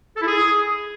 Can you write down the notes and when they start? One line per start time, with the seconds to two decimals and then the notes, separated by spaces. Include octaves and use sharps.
0.17 A4
0.22 E4
0.27 G#4